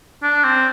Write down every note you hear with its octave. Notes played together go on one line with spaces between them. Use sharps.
D4
C4